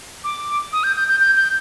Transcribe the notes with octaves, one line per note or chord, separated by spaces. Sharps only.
D6
D#6
G6
G6
G6
G6
G6